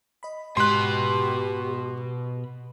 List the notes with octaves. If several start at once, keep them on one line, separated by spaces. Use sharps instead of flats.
D#5 B5
G#2 B2 G4 B5 C6 F#6